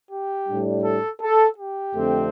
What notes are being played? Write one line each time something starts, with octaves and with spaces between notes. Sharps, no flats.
G4
A2 G3 D4
A4
A4
G4
F2 D3 A3 C4